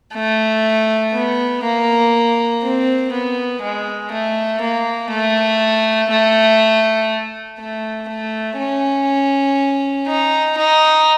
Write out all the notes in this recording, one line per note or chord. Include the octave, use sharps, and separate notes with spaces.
A3
B3
A#3
C4
B3
G#3
A3
A#3
A3
A3
A3
A3
C#4
D#4
D#4